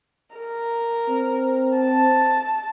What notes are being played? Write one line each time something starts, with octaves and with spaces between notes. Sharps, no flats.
A#4
C4
A5